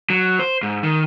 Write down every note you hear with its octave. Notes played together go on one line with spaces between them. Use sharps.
F#3
C5
G#2
D#3